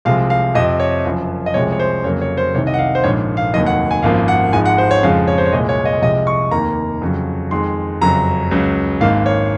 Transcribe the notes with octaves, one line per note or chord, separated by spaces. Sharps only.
C2 C3 F3 G#3 F5
F5
F2 C3 F3 D#5
C#5
F#1 F#2 F3
D#5
C2 C3 F3 G#3 C#5
C#5
C5
F2 C#3 F#3 A#3 C#5
C#5
C5
C2 C3 D#3 C#5
D#5
F#5
F5
C5
A#1 G#2 F3 A#3 C#5
F5
F1 D#2 D#3 F#3 D#5
F#5
G#5
G#1 F#2 F3 A#3 F5
F#5
G#1 G#2 F3 G#3 G#5
F#5
C5
C#5
F2 C#3 F3 G#3 F5
C#5
C5
C#5
C2 A#2 G#3 D#5
C#5
D#5
C2 C3 F3 G#3 D#5
C#6
F1 D#2 D#3 A#3 A#5
F2 C#3 F#3
F2 D#3 G#3 C6
F#1 F2 C#3 F#3 A#5
C#2 C#3 F#3
G#1 G#2 D#3 A#3 F5
C#5